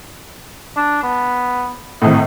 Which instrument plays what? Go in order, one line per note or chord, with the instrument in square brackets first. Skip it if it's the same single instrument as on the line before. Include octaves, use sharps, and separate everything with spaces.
[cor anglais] D4
B3
[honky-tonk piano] G#1 A2 [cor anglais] D#5